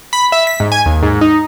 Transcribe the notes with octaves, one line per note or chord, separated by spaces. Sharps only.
B5
E5
B6
G#2
G#5
D#2
G#2
D#4